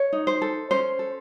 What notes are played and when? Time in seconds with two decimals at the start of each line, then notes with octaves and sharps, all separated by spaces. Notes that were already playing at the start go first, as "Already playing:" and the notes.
Already playing: C#5
0.12 D#4
0.27 C5
0.42 A4
0.71 C#4 C5
0.99 A4